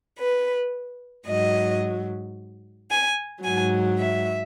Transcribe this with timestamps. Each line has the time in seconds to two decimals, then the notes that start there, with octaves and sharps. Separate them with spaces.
0.18 B4
1.26 G#2 F#3 D#5
2.90 G#5
3.43 G#2 F#3 G#5
3.98 E5